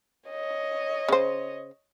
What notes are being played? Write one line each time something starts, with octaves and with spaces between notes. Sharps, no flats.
C#5 D#5
C#3 C5